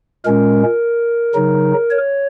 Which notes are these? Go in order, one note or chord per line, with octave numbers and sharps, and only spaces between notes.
A#2 G#3 C#4 A#4
C#3 F#3 D#4
C#5